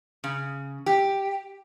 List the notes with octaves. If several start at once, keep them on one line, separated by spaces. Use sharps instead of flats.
C#3
G4